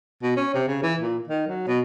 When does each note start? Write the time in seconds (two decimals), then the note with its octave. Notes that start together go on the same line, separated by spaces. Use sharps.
0.23 B2
0.36 C#4
0.54 C3
0.68 C#3
0.83 E3
1.01 A#2
1.28 D#3
1.47 F#3
1.67 B2